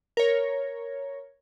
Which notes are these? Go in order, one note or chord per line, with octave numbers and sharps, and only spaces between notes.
A#4 C#5